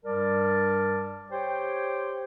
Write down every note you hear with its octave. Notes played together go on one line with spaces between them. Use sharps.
G2 G3 A#4 D5 A5
G4 C5 C#5 G5